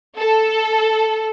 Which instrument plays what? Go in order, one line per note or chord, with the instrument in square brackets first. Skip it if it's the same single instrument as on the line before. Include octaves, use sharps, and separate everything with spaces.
[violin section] A4